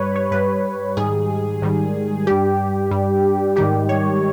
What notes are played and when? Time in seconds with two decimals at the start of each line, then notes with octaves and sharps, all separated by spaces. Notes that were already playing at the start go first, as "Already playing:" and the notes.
Already playing: G2 G3 B4 C#5
0.16 C#5
0.31 G2 G3 B4
0.97 G#2 D#3 G3 G#4
1.62 G#2 D#3 G3
2.27 G2 G3 G4
2.91 G2 G3
3.56 G#2 D#3 G3 G4
3.89 C#5